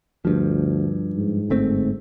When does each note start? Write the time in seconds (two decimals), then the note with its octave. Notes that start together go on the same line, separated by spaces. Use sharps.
0.25 D2 G2 F3
1.15 G#2
1.50 G1 A3 C4